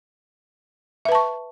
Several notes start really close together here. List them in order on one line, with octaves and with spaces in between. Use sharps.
E5 B4 A5 C#6